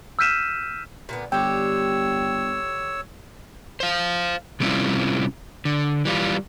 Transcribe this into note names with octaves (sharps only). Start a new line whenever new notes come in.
E6 F6 G6 B6 D#7 E7
A#2 D3 B3
G1 D3 G4 C#5 G5 E6
C5 F5
C3 G3 C4 C#4 E4 F4
D3
E3 G3 F4